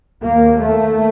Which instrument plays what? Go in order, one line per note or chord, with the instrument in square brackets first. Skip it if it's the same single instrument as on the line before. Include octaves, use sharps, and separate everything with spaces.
[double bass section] D#2 A#3
A3